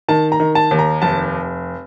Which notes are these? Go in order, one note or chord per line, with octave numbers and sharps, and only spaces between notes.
D#3 A5
A#5
D#3
A5
D#2
A#5
F1 A5